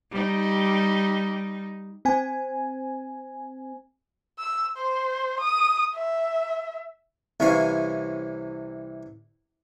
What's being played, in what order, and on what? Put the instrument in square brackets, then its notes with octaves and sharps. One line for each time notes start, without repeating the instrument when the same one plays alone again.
[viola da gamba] G3 D#4
[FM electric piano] C4 G#5
[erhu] E6
C5
D#6
E5
[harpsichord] C2 C3 E3 C#4 C#5 F5